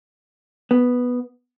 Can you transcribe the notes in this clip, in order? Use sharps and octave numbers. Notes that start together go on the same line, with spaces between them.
B3